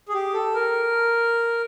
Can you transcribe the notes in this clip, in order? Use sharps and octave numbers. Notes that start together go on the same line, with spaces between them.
G#4
G4
A4
A#4